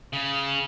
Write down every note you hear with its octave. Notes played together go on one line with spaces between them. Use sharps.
C#3